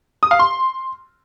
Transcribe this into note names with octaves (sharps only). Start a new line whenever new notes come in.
D#6
F5
C6